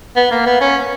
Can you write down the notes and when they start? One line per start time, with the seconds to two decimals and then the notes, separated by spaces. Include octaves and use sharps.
0.16 B3
0.31 A#3
0.46 B3
0.61 C#4